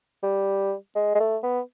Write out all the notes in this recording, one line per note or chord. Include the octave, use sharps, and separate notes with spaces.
G3
G#3
G#3
A3
B3